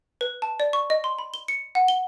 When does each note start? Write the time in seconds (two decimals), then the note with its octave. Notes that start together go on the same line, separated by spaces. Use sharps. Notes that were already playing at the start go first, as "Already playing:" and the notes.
0.21 B4
0.42 A5
0.60 D5
0.73 C#6
0.90 D#5
1.04 C6
1.19 B5
1.34 G7
1.48 C#7
1.75 F#5
1.88 G7